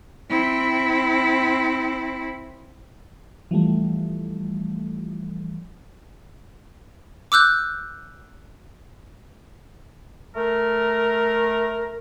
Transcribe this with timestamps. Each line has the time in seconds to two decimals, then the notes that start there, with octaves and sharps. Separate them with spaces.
0.29 C4 E4
3.51 E3 F3 G3 A3
7.32 D6 E6 F#6 G6
10.36 A3 A#4